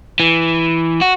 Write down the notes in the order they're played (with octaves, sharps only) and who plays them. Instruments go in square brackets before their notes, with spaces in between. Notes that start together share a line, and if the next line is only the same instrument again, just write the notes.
[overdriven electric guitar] E3
F#4